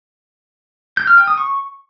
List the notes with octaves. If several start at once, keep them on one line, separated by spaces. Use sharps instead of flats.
G6
F6
G5
D#6
C#6